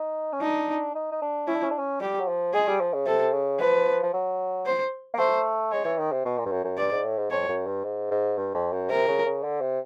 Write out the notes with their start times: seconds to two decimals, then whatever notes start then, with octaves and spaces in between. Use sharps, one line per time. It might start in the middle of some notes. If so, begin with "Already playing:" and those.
Already playing: D#4
0.33 C#4
0.42 D4 D#4
0.95 D#4
1.12 D#4
1.22 D4
1.47 C#4 E4
1.55 D4
1.63 C#4
1.71 D4
1.79 C#4
2.01 G3 G4
2.20 F#3
2.28 F3
2.54 G#3 G#4
2.67 G3
2.80 F3
2.93 C#3
3.06 C3 A4
3.33 C#3
3.60 F3 B4
4.03 F3
4.13 F#3
4.66 C5
5.14 A#3
5.19 A3 C5
5.72 G#3 C#5
5.85 E3
5.99 D#3
6.12 C3
6.25 B2
6.38 A#2
6.46 G2
6.51 F#2
6.64 F#2
6.77 G2 D5
6.92 G#2
7.04 A2
7.18 G#2
7.31 F2 C#5
7.49 F#2
7.66 G2
7.84 G#2
8.11 G#2
8.38 G2
8.54 F2
8.72 F#2
8.90 C3 A#4
9.08 C#3
9.26 C#3
9.43 D3
9.61 C3